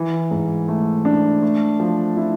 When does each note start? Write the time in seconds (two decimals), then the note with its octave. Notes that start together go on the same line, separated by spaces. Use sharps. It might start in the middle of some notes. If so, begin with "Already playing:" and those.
Already playing: E3
0.31 G#2
0.68 A3
1.05 D4
1.42 A3
1.80 F3
2.17 E4